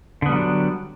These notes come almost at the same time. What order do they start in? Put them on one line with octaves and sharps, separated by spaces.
D3 B3 G3 F#3 D4